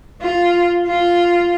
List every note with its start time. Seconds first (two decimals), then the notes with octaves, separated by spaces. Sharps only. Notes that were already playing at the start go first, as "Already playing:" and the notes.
0.21 F4
0.86 F4